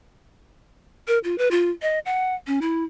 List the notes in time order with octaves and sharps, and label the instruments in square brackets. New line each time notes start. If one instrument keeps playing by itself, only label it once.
[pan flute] A#4
F4
B4
F4
D#5
F#5
C#4
E4